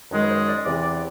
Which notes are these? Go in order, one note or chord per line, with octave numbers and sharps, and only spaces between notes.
F#2 D#3 G#3
B4
C5
D5
E2 C3 E3 D5
D5